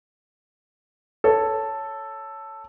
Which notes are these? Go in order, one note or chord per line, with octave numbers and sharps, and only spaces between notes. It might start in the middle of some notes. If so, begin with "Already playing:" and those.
A4 C#5